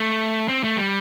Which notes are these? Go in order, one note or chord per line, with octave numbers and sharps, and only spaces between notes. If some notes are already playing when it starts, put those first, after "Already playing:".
Already playing: A3
C4
A3
G3